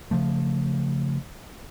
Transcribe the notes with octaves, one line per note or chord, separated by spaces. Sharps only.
C#3 F3 A3